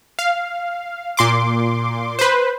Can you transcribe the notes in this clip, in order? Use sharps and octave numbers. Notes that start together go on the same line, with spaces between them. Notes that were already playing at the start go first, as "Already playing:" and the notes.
F5
A#2 C6 D6
B4 C5